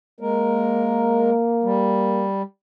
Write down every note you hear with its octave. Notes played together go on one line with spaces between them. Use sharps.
G#3 A#3 A#4
G3